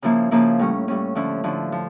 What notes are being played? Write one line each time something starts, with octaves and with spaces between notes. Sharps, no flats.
C#3 F3 A#3 E4
C#3 F3 A#3 E4
A2 G3 C#4
A2 G3 C#4
D3 F3 C#4 E4
D3 F3 C#4 E4
F3